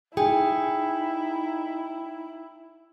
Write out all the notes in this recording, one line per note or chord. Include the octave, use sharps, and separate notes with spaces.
D#4 E4 G#4 G5